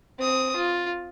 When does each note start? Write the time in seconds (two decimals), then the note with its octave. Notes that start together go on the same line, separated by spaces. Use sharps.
0.19 C4 D#6
0.56 F4